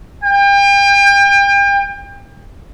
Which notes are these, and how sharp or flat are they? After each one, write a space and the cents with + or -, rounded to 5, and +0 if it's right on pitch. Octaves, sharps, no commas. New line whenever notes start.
G5 +35